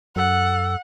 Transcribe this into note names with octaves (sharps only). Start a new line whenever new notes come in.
F#2 A4 F#5